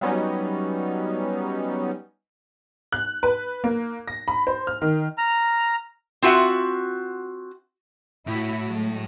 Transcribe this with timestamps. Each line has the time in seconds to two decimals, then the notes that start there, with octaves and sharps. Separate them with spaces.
0.01 F#3 G3 B3 C#4 D#4
2.92 F#6
3.23 B4
3.64 A#3
4.08 A#6
4.28 B5
4.47 C5
4.67 F6
4.82 D#3
5.18 A#5 F6
6.22 C4 F4 F#4 E5 F#5
8.27 A2 E4 F#4
8.66 F#3 G#3 A3